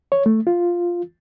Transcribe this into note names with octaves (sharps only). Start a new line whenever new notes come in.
C#5
A3
F4